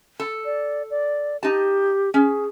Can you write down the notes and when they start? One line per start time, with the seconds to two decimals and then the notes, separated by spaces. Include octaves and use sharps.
0.20 A4
0.45 D5
0.90 D5
1.43 D#4 G4 A5
2.14 C#4 G#4